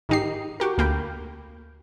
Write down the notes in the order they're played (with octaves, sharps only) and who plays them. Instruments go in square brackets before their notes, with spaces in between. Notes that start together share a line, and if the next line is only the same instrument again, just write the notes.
[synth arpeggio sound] G#2 D#3 D#4 G4 C7
F#4 G4 A#4
D2 A#3 G5 B5